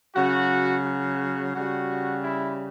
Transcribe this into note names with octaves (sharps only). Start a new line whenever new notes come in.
C#3 F#3 F#4
F#4
C#3 G3 F#4
E4